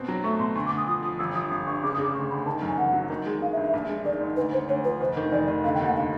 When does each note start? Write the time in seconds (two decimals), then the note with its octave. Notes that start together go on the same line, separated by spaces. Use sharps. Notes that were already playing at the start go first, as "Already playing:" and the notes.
Already playing: B2 C4
0.08 F#3
0.24 A3 C#6
0.39 B2 C6
0.55 D2 C#6
0.66 D6
0.71 D2
0.77 D#6
0.87 F3 D#6
1.03 F3 D#6
1.19 G1 E6
1.35 F3 D#6
1.51 G1 D#6
1.67 G2 C#6
1.83 C#3 D6
1.93 D#6
1.98 C#3
2.04 D6
2.14 D2 C#6
2.30 D2 B5
2.46 D#3 A5
2.62 F#2
2.67 G#5
2.78 F#1 F#5
2.93 F#3
3.10 D#3
3.26 G#3
3.41 D#3 F5
3.52 E5
3.57 G2
3.63 E5
3.73 A#1
3.89 G#3
4.05 D#3 D5
4.20 G#2
4.36 D2 B4
4.53 D2 C5
4.69 D2 C#5
4.84 F3 B4
5.00 F1 C5
5.17 D#3
5.32 F1 D5
5.48 F1
5.64 D3 F5
5.74 G5
5.80 D#2 F#5
5.95 D3 F5